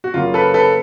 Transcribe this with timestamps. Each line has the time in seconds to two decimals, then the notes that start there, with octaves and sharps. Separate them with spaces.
0.04 F#4
0.14 F#2 C#3 F#3 A#3 F4
0.34 A4 B4
0.54 A4 B4